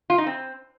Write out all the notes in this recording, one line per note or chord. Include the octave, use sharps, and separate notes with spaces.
F4
D#4
C4